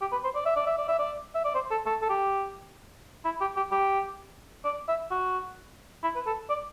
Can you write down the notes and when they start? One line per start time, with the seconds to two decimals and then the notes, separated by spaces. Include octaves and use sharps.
0.01 G4
0.12 B4
0.24 C5
0.35 D5
0.45 E5
0.56 D5
0.67 E5
0.78 D5
0.88 E5
0.99 D5
1.35 E5
1.45 D5
1.55 C5
1.71 A4
1.86 A4
2.02 A4
2.09 G4
3.25 E4
3.41 G4
3.57 G4
3.72 G4
4.64 D5
4.88 E5
5.11 F#4
6.03 E4
6.15 B4
6.27 A4
6.50 D5